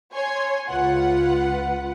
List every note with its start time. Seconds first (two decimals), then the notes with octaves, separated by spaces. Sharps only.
0.14 C#5 G#5 C6 G#6
0.68 C#2 F4 B4 F#5